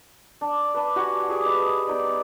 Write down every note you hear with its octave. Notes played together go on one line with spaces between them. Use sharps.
D4
D4 B4
F#4 G4 F#5 G#5
G4 G#4 G#5 D6
B4 D#5
B3 D#4 D5